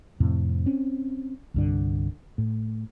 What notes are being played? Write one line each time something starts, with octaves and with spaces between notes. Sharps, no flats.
F2 A2 C3
C4 C#4
C2 G2 D3
A2